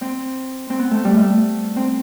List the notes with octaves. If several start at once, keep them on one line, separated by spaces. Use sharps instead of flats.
C4
C4
B3
A3
G3
A3
C4